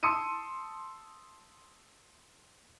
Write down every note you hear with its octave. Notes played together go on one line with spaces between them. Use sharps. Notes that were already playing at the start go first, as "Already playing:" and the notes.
A5 C6 D#6 E6 C#7 D#7